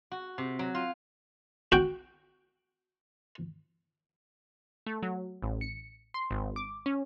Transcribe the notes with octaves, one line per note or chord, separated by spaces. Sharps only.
F#4
C3
F#3
F4
F#4 G5
A3
F#3
A1
C#7
C6
G#1
D6
C#4